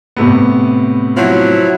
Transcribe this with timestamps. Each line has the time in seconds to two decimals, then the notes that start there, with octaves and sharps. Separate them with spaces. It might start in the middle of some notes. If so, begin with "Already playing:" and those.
0.16 A2 C3 B3
1.17 F3 F#3 E4